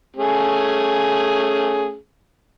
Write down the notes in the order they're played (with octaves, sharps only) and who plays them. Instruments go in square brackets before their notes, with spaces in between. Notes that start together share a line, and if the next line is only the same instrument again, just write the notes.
[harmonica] A3 C#4 G#4